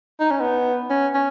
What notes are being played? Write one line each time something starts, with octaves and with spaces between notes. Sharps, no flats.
D#4
C#4
B3
C#4
C#4